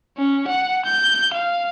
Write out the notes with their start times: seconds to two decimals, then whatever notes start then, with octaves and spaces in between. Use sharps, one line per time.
0.17 C#4
0.48 F#5
0.85 G6
1.33 F5